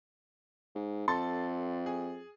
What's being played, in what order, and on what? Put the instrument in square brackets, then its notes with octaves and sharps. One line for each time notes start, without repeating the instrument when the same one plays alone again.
[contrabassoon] G#2
[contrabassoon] F2 [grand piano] A4 C6 A6
[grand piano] G#4